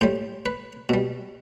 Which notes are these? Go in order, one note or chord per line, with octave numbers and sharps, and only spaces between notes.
A2 G3 C5
B4
B2 G3